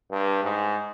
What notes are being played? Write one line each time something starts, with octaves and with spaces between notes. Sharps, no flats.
G2
G#2